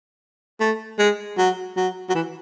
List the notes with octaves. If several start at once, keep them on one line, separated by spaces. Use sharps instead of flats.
A3
G#3
F#3
F#3
F#3
E3